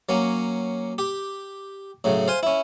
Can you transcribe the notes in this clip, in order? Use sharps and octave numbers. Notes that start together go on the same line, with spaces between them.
F#3 A#3 C#4
G4
A2 C#3 F#3
C5 F5 G#5 C6
C#4 E4